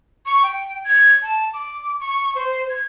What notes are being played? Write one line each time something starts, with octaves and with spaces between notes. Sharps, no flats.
C#6
G5
G#6
A5
D6
C#6
C5
G#6